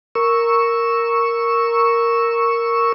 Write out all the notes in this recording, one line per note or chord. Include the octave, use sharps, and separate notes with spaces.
A#4 C#6 E6